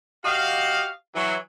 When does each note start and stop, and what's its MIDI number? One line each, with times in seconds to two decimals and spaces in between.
0.24 0.89 66
0.24 0.89 67
0.24 0.89 75
0.24 0.89 77
1.14 1.35 52
1.14 1.35 54